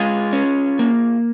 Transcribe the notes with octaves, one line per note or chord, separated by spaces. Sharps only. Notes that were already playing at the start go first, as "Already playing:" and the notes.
Already playing: G#3 F4 G#4
C#4
A#3